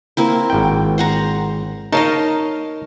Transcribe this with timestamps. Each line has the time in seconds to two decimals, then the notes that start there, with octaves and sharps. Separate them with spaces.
0.17 A#3 C4 E4
0.50 G#1 G5
0.98 C5 F#5 A#5
1.92 D#4 A#4 C#5 D#5 F5 A5